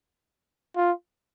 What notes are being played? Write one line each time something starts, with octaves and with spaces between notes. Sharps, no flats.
F4